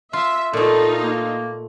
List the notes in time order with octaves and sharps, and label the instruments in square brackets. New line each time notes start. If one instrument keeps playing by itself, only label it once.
[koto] F4 [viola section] E5
[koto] A#2 A3 [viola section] D#4 F4 [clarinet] A4
[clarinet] A#3